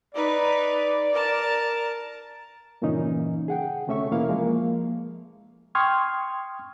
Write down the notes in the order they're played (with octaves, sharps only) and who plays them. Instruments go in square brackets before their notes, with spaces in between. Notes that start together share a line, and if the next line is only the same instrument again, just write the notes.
[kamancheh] D#4 B4 [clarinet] D5
[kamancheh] A#4 A5
[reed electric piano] G2 A#2 C#3 E3 C#4 D#4
G#4 F#5 G5
D2 C3 A3 C#4 E5 C#6
E2 B2 A#3 B3 E4 F5
F3 G#3 A#3
G5 C6 C#6 D#6 F6 G#6